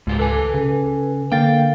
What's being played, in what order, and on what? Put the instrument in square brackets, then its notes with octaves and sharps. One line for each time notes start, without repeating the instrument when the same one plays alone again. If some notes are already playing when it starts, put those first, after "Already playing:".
[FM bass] C#2 [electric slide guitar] G#2 F4 G4
[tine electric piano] A4 [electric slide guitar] B4 G#5
[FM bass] C#3
[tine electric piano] D3 F5 A6 [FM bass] A#3 [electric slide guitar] G5